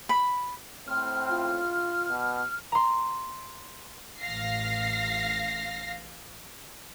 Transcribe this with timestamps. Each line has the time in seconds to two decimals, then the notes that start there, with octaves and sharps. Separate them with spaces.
0.09 B5
0.87 A2 C4 F6
1.30 F4
2.09 B2
2.72 A#5 C6
4.21 A1 F5 A#6 C7